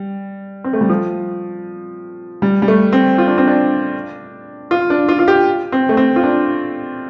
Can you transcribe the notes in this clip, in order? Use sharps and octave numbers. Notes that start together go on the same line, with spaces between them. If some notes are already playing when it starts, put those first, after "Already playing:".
Already playing: G3
C4
A3
G3
F3
G3
G3
A3
C4
F4
D4
C4
D4
F4
D4
F4
F4
G4
C4
A3
C4
F4
D4